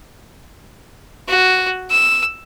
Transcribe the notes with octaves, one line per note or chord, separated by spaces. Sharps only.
F#4
E6